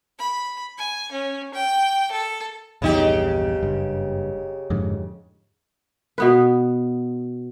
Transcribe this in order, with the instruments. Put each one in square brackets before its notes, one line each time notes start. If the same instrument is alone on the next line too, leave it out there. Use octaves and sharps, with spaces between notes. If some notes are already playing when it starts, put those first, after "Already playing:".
[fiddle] B5
G#5
C#4
G5
A4
[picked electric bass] A#1 E2 G2 [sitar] C#3 D#4 G4
[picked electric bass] F#1 G2
F2 G#2 D3
[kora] B2 B3 B4